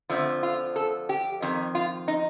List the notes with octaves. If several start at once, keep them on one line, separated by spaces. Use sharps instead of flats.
F2 D3 F3 A3
F4
A4
G4
F2 D#3
F4
D#4